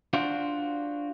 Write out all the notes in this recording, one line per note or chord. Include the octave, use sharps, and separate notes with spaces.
D4 F4 F#4 C5 D5